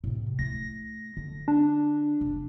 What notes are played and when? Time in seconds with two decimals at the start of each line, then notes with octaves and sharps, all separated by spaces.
0.04 A2 C3
0.39 A3 E4 A#6
1.17 D3
1.48 D4
2.21 F1